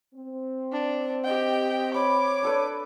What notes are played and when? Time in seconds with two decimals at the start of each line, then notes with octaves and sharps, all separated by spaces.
0.15 C4
0.72 D4
1.25 G4 D#5 G5
1.94 C#5 B5 D6
2.42 D4 A4 B4